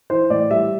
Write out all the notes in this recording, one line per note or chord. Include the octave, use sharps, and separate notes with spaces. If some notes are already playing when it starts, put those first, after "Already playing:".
E3 C5
A2 D5
G3 E5